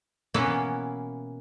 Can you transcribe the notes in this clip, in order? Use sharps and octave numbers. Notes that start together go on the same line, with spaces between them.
B2 E3 A#3 B3 C#4 E4